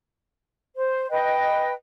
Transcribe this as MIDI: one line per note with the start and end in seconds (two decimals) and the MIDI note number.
0.76 1.10 72
1.10 1.73 71
1.10 1.73 75
1.10 1.73 79